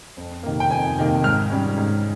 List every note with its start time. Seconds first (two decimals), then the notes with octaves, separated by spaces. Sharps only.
0.17 F2
0.43 C3 D#3 A#3
0.60 G5
0.71 F2 G#5
0.98 C3 D#3 A#3
1.23 G#2 F6
1.50 G3 C#4
1.77 G#2